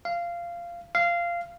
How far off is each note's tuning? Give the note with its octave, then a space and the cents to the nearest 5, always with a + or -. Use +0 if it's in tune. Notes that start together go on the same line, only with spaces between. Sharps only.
F5 -15
F5 -15